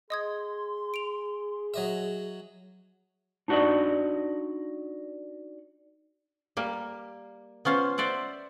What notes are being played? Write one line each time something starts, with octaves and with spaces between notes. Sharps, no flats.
G#4 D#5 C6 D#6 G#6
D7 F7
F#3 D#5 E5
D4 D#4 F#4 D5 D#5
G3 A#3
B3 C#4 F4 C5
C5 D5 E5 F#5